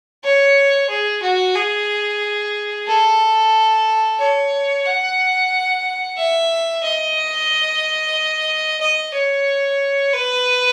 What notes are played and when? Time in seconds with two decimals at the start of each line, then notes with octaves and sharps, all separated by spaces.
0.24 C#5
0.89 G#4
1.22 F#4
1.55 G#4
2.88 A4
4.19 C#5
4.86 F#5
6.17 E5
6.83 D#5
8.80 D#5
9.14 C#5
10.13 B4